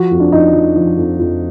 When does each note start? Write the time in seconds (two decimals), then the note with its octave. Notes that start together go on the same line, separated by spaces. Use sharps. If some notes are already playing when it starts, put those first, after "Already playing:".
Already playing: F3 F#4
0.11 F2
0.20 D4
0.32 F2 D#4
0.53 F3
0.75 F3
0.97 F2
1.19 F2